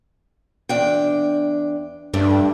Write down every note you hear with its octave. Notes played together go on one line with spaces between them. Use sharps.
E2 D4 G5
G2 A3 D4